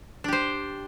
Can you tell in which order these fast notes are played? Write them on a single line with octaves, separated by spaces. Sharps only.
D4 G4 C5